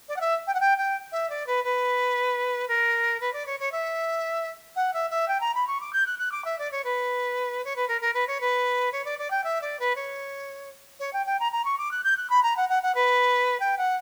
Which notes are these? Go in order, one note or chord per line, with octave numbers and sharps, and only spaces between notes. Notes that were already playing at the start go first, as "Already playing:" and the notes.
D5
F#5
E5
G5
F#5
G5
G5
E5
D5
B4
B4
A#4
B4
D5
C#5
C#5
E5
F#5
E5
E5
G5
A#5
B5
C#6
D6
G6
F#6
F#6
D6
E5
D5
C#5
B4
C#5
B4
A#4
A#4
B4
C#5
B4
C#5
D5
D5
G5
E5
D5
B4
C#5
C#5
G5
G5
A#5
A#5
C#6
D6
F#6
G6
F#6
B5
A#5
F#5
F#5
F#5
B4
G5
F#5